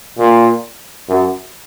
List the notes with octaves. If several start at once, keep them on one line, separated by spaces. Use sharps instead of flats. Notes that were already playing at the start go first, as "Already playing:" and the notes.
A#2
F#2